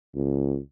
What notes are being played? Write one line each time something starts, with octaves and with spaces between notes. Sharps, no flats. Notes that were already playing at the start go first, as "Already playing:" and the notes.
C#2